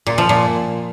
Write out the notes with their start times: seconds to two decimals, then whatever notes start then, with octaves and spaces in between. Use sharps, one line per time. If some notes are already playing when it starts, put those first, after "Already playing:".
0.07 A#2
0.18 F3
0.29 A#2